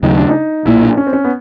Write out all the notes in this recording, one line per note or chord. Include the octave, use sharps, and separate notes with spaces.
D#2 C#3 F#3 A3 D#4
D4
D#4
B1 A#2 F#3 A#3 E4
D4
C#4
C4
C#4
B3